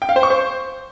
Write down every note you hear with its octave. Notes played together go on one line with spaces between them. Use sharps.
G5
F5
C5
C#6
C5